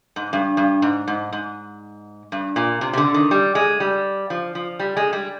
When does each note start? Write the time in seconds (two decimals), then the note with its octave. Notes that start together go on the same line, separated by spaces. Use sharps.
0.16 G#2
0.33 G2
0.57 G2
0.82 G#2
1.08 G#2
1.33 G#2
2.32 G2
2.56 A#2
2.81 C3
2.93 C3
2.97 D3
3.14 D#3
3.31 G3
3.55 G#3
3.80 G3
4.30 F3
4.55 F3
4.79 G3
4.97 G#3
5.13 G3